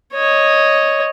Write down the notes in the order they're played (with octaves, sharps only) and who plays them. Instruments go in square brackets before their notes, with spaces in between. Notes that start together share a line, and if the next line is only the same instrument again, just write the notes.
[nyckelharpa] C#5 D#5